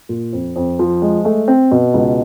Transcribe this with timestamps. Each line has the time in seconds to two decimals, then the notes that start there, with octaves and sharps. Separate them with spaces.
0.09 A#2
0.33 F2
0.56 F2
0.79 F3
1.02 G#3
1.25 A3
1.48 C4
1.71 B2
1.94 C#2